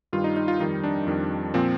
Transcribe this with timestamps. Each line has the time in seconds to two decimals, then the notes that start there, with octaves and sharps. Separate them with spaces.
0.13 G2 D#3 G3 F4
0.24 D#4
0.37 D#4
0.48 F4
0.60 F2 D#3 G3 D#4
0.83 D4
1.07 F2 D#3 G3
1.54 A#2 F3 C4